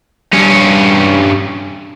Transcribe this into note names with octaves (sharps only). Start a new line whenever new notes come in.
G2 C#4